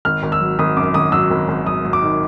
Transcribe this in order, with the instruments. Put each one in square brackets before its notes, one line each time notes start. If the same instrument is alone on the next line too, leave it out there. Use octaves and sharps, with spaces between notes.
[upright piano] G#1 F6
G#1
E6
F#3
G#1 D#6
F#2 D6
G#1 D#6
F#3 E6
G#1
G#1
F#3 D#6
F#3
D6
D#3